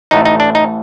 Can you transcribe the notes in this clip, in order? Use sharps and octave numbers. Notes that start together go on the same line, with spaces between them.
A1 A2 A3 D#4
D#4
D4
D#4